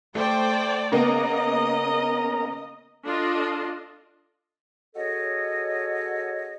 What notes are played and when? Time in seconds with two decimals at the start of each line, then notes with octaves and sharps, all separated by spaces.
0.15 A3 C5 D5 G5
0.92 C#3 A#3 B3 C#4 A#4 D#5 A#5
3.06 D4 F4 A4 D#5
4.95 C#4 F#4 G#4 A4 C#5 D#5